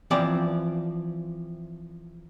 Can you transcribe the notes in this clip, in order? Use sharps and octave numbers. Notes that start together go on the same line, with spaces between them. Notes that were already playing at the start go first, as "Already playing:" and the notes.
E3 F3 C4 D5